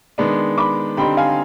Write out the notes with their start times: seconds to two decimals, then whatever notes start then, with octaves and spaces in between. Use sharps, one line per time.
0.18 D#3 G#3 B3 D4
0.58 B5 D6
0.97 D3 G3 C4 D#4 G5 B5
1.17 F5 G#5